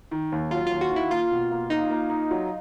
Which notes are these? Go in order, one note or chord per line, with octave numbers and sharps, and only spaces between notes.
D#3
D#2
F#3 F4
F4
D#2
F#4
D#3
E4
A#3 F4
B2
A#3
A#3 D#4
A#3
D#4
F#3